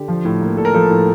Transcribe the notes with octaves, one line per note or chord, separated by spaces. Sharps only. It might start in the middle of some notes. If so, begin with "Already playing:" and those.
Already playing: D3 G4
F3
A2
A#3
A2 A4
A#4
F3 A4
A2